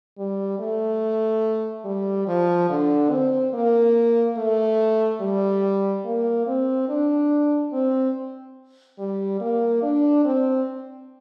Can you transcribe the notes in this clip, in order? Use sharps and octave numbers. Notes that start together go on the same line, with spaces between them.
G3
A3
G3
F3
D3
C4
A#3
A3
G3
A#3
C4
D4
C4
G3
A#3
D4
C4